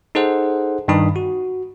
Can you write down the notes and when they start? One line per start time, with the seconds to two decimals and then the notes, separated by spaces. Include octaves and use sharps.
0.15 D#4 G#4 A4 C5 F#5
0.88 G2 D#3 D#4 B5 D#6
1.16 F#4